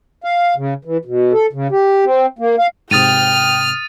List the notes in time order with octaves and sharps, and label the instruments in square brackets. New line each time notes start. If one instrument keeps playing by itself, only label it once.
[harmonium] F5
C#3
E3
B2
A4
C#3
G4
C4
A#3
F5
[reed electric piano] G#2 C3 [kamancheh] G5 [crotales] D#6 A6 D#7 [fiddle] F6